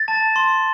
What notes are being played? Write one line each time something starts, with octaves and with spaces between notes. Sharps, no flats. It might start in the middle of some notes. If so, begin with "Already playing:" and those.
Already playing: A6
A5
C6